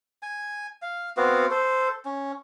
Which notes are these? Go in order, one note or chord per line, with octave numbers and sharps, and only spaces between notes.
G#5
F5
B3 C4 F#4 F5
A4 C5
C#4